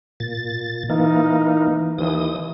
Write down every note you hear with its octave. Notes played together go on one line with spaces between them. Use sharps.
A#2 A6
E3 A#3 D#4
D#2 E3 D#6